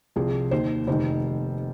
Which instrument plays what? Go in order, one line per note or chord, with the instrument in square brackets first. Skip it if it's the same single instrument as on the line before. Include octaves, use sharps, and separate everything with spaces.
[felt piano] C2 C3 F3 G#4
D#2 D#3 C5
F1 D#3 C5